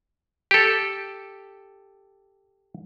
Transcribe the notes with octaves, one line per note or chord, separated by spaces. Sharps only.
G4 A4